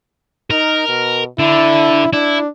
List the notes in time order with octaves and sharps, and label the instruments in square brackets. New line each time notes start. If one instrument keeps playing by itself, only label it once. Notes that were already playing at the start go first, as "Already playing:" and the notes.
[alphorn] D#4 [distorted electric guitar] A#4
[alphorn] B2
[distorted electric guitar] D3 [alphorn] E4
[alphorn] D4 [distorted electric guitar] E4